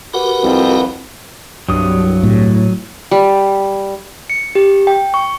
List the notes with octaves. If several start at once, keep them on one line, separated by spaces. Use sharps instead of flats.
F#4 G4 A#4 B4 F#5 B5
C2 F2
C2 G2 F#3 D#6
A2
G3
C#7
G4
G5
C#6